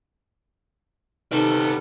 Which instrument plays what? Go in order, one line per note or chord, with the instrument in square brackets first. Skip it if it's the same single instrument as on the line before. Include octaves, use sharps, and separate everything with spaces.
[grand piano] C3 D#3 [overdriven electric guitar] G3 B3 [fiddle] A4